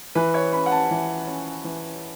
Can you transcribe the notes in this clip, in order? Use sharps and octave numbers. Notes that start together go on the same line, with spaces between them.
E3 B4
C#5
C#4 B5
F#5
A5
E3
C#4
E3